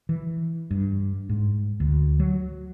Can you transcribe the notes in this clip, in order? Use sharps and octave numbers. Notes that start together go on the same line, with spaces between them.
E3
G2
G#2
D2
F#3